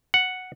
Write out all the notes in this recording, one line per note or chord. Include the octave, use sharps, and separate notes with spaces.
F#5